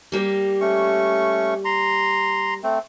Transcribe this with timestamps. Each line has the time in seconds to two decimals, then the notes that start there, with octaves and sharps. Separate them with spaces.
0.12 G3 A#3 G4
0.61 A3 C#4 C#6
1.65 A#5 C6
2.64 A3 C4